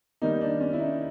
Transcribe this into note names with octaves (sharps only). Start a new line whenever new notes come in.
D#3 G3 A#3 D#4
D4
C#4
E4
D#4